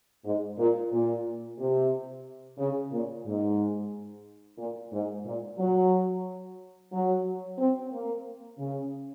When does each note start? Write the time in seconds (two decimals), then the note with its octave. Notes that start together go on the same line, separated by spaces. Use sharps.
0.25 G#2
0.58 A#2
0.92 A#2
1.59 C3
2.58 C#3
2.91 A#2
3.25 G#2
4.58 A#2
4.92 G#2
5.25 A#2
5.59 F#3
6.92 F#3
7.58 C4
7.92 A#3
8.58 C#3